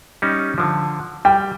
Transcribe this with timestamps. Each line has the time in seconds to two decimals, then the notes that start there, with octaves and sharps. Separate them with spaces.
0.22 G3 C#4 D#4
0.58 D3 F3
1.25 G3 G5